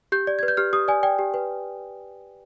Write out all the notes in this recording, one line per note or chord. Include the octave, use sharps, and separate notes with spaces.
G4 G6
D5
B4 G#6
G6
G4 F6
G4 D#6
D5 G#5
D5 G5
G4
B4